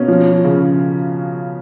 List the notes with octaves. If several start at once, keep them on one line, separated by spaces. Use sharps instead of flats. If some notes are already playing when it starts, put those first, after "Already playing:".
Already playing: B2 A#3 C#4
F3
C#3